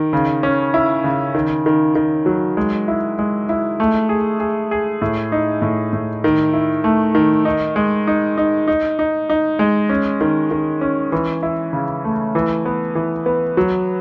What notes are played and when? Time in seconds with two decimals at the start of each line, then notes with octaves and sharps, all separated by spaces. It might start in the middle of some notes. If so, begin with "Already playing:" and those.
Already playing: D#3
0.13 C#3
0.43 C#4
0.74 E4
1.04 C#3
1.34 D#3
1.66 D#3
1.95 D#3
2.26 F#3
2.57 G#3
2.88 E4
3.19 G#3
3.49 E4
3.80 A3
4.09 G#4
4.40 G#4
4.71 G#4
5.02 A2
5.32 D#4
5.62 A2
5.93 A2
6.24 D#3
6.53 E4
6.84 A3
7.15 D#3
7.45 D#4
7.76 G#3
8.07 D#4
8.38 D#4
8.68 D#4
8.99 D#4
9.30 D#4
9.59 G#3
9.90 C#4
10.21 D#3
10.51 D#3
10.81 C#4
11.12 E3
11.43 E4
11.73 C#3
12.05 A3
12.35 E3
12.65 B3
12.95 E3
13.26 B3
13.57 F#3